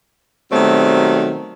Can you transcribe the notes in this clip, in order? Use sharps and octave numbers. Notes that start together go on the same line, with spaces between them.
B2 D#3 F#3 G3 A3 C4